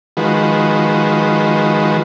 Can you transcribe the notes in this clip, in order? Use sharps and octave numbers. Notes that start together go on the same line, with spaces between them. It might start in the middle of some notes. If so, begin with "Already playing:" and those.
D#3 F3 G#3 F#4 B4